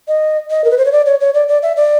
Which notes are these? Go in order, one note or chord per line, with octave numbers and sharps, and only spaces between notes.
D#5
D#5
A#4
B4
C5
C#5
D5
C#5
C#5
D5
D5
E5
D5